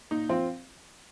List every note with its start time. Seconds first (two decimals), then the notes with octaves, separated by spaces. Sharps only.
0.11 A#2 D#4
0.29 F3 C4 F4